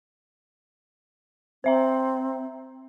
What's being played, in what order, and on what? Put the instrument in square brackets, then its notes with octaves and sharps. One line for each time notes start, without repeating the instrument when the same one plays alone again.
[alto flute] C4 [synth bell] C5 E5 A#5